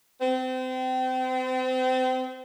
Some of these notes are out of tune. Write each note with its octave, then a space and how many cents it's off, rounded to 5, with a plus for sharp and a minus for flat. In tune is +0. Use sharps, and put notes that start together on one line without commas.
C4 -30